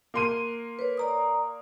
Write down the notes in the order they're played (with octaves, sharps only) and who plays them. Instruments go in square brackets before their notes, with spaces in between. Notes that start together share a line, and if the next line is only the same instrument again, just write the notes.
[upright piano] A#3 C6 D#7
[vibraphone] B4 C#5
D5 A#5 D#6